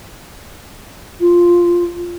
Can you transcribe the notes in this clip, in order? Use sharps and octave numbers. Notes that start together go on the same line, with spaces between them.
F4